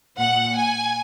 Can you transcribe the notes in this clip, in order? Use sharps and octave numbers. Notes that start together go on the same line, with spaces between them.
A#2 F#5
G#5